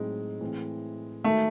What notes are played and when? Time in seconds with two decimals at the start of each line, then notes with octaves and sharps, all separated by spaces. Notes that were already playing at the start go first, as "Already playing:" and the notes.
Already playing: A2 F#3 G#3 C4 D#4
0.41 A2 E3 C4
1.24 D#3 G#3 A3 D#4 F#4 A4